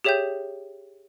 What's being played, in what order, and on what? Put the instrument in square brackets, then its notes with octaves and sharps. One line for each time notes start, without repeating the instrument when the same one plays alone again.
[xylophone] G4 G#4 C#5 E5 G5 G6